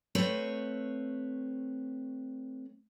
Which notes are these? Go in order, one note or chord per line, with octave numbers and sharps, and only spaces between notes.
A3 C4 B4 C#5